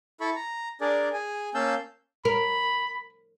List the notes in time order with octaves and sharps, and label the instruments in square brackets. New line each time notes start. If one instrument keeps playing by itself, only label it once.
[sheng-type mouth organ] E4 A4 B5 C#6
A#5
D4 G#4 A#4 D5
G#4 G#5
A#3 C#4 F5 A5 E6 G6
[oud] A#4 [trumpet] B5